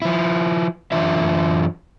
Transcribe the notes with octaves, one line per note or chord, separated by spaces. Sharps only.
F3 E4
F#2 E3 D4 F4 E5